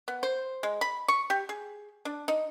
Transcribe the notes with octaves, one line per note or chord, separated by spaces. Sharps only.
B3
C5
G#3
B5
C#6
G4
G#4
D4
D#4